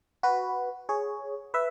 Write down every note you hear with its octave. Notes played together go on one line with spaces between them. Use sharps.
F#4 B4
G#4 C#5
B4 E5